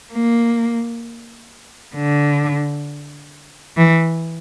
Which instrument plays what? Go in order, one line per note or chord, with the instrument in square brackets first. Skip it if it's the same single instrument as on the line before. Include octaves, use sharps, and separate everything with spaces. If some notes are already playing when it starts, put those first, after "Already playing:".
[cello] A#3
D3
E3